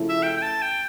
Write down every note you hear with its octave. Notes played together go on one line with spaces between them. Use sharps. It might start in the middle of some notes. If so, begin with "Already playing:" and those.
Already playing: C#3 F3 A3 E4
E5
G5
G5
A5
G5